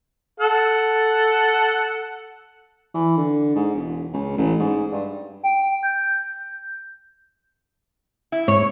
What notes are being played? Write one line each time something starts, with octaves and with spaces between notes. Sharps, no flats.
A4 F#5
E3
D3
G#2
E1
C#2
A1
G#2
G2
G5
G6
E4
G#2 C#5